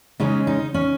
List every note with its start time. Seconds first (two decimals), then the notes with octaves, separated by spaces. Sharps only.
0.20 C#3 G#3 C#4 D#4
0.47 D#4
0.74 C#4